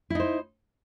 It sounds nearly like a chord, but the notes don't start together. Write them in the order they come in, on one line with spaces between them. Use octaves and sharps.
E4 D#4 C5